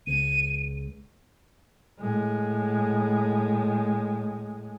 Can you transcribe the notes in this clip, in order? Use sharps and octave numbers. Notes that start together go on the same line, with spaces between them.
C#2 D#7
A2 G#3